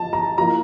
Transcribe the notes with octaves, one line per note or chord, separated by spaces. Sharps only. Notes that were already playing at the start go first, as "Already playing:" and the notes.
Already playing: F3 A5
A#5
F3 A#3 E4 A#5